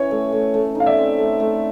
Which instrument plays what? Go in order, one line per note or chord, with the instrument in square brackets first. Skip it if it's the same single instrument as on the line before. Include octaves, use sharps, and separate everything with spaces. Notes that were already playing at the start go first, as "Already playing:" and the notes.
Already playing: [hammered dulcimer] E3 C#4 [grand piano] C#5
[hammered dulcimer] A3
A3
A3
D#4
[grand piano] F5
D5 E5
[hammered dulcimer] C4
A3
A3